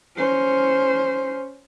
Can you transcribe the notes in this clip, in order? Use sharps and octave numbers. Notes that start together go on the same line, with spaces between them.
C#4 C5